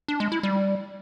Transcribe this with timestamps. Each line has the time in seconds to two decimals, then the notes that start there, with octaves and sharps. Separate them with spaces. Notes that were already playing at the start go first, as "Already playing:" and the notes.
0.08 D4
0.20 G#3
0.32 E4
0.43 G3